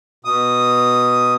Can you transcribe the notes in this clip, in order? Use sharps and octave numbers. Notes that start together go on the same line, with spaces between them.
B2 D#6